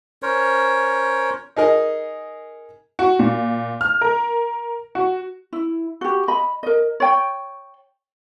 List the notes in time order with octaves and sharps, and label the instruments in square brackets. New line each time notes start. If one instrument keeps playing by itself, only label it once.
[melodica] C#4 A#4 C5 C#5
[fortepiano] D#4 G#4 A#4 D#5
[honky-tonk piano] F#4
A#2
F6
A#4
F#4
[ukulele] E4
F#4 G4
D#5 B5
A#4 D#5
C#5 G5